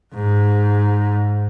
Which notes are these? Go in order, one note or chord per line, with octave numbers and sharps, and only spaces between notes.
G#2